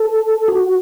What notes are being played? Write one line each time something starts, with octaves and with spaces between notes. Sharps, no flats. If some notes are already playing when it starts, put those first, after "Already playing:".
Already playing: A4
F#4